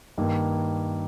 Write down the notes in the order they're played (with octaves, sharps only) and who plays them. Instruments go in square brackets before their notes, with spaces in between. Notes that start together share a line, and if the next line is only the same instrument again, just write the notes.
[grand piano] G2 D#3 A#3